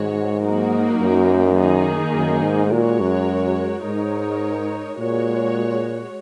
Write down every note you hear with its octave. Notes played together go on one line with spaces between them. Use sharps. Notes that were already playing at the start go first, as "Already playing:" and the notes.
Already playing: G#2 D#3 G#3 F#4 C#5
F#3 A#3 D#4 F#4 A#4
F#2
D#3 A#3 D#4 G#4
F#2
G#2
A#2 G#3 F#4 A#4 C#5
F#2
G#2 G#3 D#4 A#4 C#5
A#2 G#3 F#4 C#5